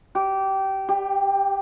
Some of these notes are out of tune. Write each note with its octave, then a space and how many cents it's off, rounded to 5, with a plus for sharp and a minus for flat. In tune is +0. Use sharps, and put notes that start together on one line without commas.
G4 -20
G4 +15